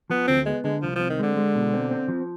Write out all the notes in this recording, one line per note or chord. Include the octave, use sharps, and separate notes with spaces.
F3 B3
D2 C4
G#3 B3
D3 G#3
C2 F3
F3
C4
D#3
D3 G#3
G#3
B2
C4
C4
F3